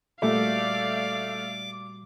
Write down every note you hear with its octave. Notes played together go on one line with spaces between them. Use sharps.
A#2 G3 A3 F#4 D5 F5 D6